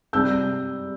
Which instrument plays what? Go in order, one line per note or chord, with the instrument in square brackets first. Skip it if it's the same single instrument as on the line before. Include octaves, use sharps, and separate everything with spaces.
[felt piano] C3 G3 E6 G6